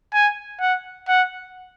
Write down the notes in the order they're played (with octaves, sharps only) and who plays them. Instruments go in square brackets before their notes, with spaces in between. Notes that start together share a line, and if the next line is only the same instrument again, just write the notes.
[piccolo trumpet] G#5
F#5
F#5